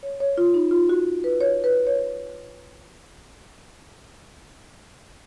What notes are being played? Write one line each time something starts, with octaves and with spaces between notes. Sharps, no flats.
C#5
C#5
F4
D#4
F4
F#4
B4
C#5
B4
C#5